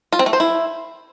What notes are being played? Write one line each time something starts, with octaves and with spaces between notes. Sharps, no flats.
F4
C4
A3
C5
E4